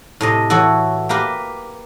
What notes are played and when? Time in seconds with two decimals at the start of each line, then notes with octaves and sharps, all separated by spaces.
0.21 A2 C3 D#5
0.50 E3 F#4 A4 C#5
1.09 A#3 G4 A#4 B4